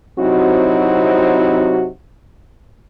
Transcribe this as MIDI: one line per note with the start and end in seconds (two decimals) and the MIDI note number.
0.19 1.87 48
0.19 1.87 54
0.19 1.87 60
0.19 1.87 63
0.19 1.87 64
0.19 1.87 66